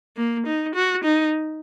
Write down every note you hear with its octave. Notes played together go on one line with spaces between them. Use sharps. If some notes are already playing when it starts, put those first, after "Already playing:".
A#3
D#4
F#4
D#4